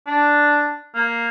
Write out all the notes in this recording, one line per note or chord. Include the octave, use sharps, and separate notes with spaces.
D4
A#3